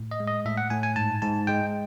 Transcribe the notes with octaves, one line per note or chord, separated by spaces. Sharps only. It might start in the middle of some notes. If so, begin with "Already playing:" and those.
Already playing: A2
D#5
G#3
D#5
A2 E5
F#5
A2 G#5
G#5
G#2 A5
G#2 A5
G#3 G5